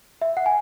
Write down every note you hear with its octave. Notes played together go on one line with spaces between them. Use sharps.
E5
F#5
G#5